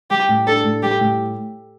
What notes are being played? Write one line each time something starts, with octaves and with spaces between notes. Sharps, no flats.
G3 G4
A2
D4 A4
A2
G3 G4
A2